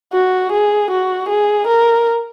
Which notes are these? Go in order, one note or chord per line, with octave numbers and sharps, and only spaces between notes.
F#4
G#4
F#4
G#4
A#4